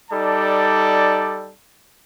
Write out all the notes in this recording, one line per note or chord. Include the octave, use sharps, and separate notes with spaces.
G3 D#4 A4 D5 A5